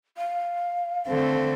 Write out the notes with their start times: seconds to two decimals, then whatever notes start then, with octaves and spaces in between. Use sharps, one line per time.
0.17 F5
1.07 D3 A3 C4